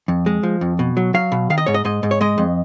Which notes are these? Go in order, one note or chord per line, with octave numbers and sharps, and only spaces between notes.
F2
G#3
F3
F2
B2
F#3
F#3 F5
B2
D#3 F5
D#5
G#2 C#5
D#5
G#2 D#5
G#2
C#5
G#3 D#5
F2